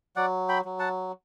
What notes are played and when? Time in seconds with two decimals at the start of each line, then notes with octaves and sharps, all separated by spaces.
0.16 F#3 D5 F#5
0.49 G5 B5
0.65 F#3
0.79 F#5 A5